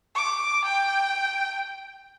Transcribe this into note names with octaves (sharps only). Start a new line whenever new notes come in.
D6
G5